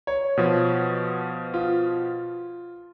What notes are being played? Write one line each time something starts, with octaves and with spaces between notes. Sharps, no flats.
C#5
B2 F3
F4